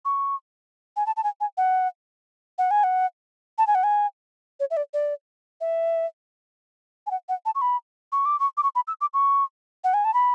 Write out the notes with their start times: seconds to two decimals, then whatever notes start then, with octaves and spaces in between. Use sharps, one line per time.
0.05 C#6
0.97 G#5
1.06 A5
1.17 A5
1.24 G#5
1.41 G#5
1.57 F#5
2.58 F#5
2.71 G#5
2.84 F#5
3.58 A5
3.67 G#5
3.75 F#5
3.84 G#5
4.60 C#5
4.71 E5
4.77 D5
4.94 D5
5.61 E5
7.07 G#5
7.11 F#5
7.29 F#5
7.46 A5
7.55 C#6
7.61 B5
8.12 C#6
8.25 D6
8.40 C#6
8.57 D6
8.63 C#6
8.75 B5
8.87 E6
9.01 D6
9.14 C#6
9.84 F#5
9.94 G#5
10.05 A5
10.14 B5